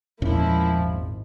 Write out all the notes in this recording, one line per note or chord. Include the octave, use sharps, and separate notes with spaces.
E2 A#2 F3 G#3 A#3 C#4 E4
G#1